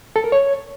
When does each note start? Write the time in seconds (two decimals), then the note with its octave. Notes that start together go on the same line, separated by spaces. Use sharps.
0.16 A4
0.24 A#4
0.32 C#5